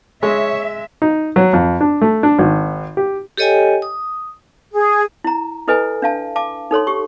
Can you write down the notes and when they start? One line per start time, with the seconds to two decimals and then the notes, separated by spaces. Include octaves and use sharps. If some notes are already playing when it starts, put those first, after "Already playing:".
0.23 G#3 C#5 E5
1.02 D#4
1.36 F#3
1.53 F2
1.81 D4
2.01 A3
2.23 D4
2.38 G#1
2.97 G4
3.37 G4 A4 C#5 D#5 G5 G#5
3.82 D#6
4.72 G#4
5.24 E4 A#5
5.68 E4 A4 B4 D#5 G#5
6.02 D4 F5 A5
6.36 F5 A5 D6
6.71 D#4 A4 C#5 C6
6.87 G4 C#6